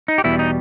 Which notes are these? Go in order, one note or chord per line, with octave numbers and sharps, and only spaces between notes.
D#4
G4
E2 B2 G3 E4
D#4